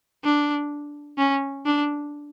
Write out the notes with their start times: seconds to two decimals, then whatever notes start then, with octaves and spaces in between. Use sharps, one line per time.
0.24 D4
1.18 C#4
1.66 D4